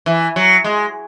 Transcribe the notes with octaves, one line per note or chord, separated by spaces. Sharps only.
E3
F#3
G#3